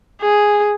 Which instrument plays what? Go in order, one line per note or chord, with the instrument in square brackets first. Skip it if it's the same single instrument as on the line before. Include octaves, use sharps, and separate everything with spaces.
[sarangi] G#4